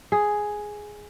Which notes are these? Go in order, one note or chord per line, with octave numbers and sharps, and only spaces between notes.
G#4